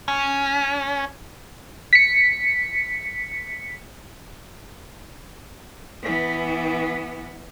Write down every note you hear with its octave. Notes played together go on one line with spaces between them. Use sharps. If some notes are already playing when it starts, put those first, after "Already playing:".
C#4
B6 C#7
E3 B3